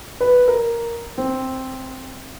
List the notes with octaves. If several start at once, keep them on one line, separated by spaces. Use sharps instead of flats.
B4
A#4
C4